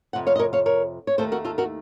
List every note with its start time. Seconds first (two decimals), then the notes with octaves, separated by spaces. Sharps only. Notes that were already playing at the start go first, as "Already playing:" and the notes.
0.13 F2 C3 F#5
0.27 C#5 F5
0.36 D#5
0.39 A#4 C#5
0.53 C#5 F5
0.66 A#4 C#5
1.07 C#5
1.18 D#2 D#3 A3 A4 C5
1.32 F#4 A#4
1.45 F4 A4
1.58 F#4 A#4